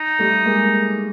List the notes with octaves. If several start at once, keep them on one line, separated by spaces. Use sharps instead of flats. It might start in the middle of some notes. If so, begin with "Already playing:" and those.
Already playing: D#4
G3 A3
G#3 A#3